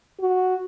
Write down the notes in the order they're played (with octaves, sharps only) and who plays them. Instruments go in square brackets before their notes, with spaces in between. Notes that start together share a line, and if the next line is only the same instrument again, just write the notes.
[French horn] F#4